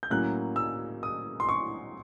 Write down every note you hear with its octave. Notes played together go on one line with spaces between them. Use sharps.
G6
A2 F#3 A#3 C#4 F#6
E6
D#6
C6
C#6